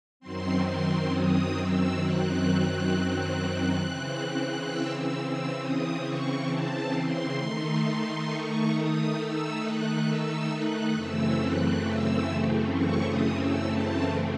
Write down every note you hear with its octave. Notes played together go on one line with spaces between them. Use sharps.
F#2 D#3 F#3 C4 C6
C6
D#6
E6
F#6
C#3 E3 C4
E6
E6
E6
D#6
C#6
A5
C6
D#3 A3 D#4
C#6
D#6
E6
F#6
E6
F#6
F#2 C#3 E3 A3 C4 E6
F#6
E6
C#6
D#6
E6
A5